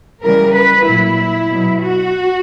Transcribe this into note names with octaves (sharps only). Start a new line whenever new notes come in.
C#3 E3 G3 A#4
B4
A#2 F#3 E4
B2 F#3
F#4